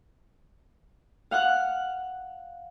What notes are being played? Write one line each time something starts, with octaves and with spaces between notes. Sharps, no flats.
F5 F#5 F6 F#6